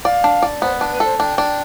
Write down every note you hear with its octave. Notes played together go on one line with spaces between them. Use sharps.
D5 F5
D4
D5
B3 C5
D4 B4
B4
A4 C5
D4 G5
D4